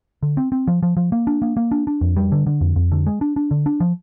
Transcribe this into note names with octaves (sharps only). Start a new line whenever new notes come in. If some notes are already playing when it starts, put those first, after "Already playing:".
D3
C4
C4
F3
F3
F3
A#3
D4
A#3
A#3
D4
D4
F2
G3
D3
D3
F2
F2
D3
G#3
D4
D4
D3
D4
F3